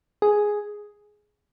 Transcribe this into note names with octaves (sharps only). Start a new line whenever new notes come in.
G#4